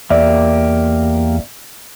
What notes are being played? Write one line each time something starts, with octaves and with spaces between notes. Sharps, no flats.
E2 A#3 G4 D5 E5